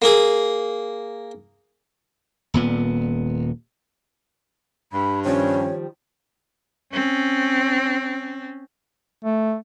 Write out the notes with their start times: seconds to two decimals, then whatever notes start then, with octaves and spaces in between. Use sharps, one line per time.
0.02 A#3 G#4
2.54 D#1 A#2 B3
4.93 G2 B5
5.25 D#3 F3 G3 C#4 C#5
6.92 C4 C#4
9.25 A3